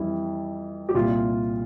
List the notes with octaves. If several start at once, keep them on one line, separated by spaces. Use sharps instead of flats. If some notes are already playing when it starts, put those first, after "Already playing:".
Already playing: F2 E3 G3 E4
G4
C2 A#2 G3 F4